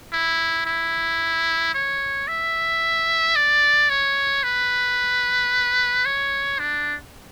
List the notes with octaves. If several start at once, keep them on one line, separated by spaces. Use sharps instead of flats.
E4
E4
C#5
E5
D5
C#5
B4
C#5
D4